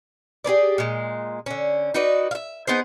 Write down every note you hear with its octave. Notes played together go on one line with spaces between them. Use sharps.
G4 G#4 B4 D5
A#2 G#3
D3 C#4
D#4 F#4 B4 D5
E5 F5
B3 D#4 G#4 C5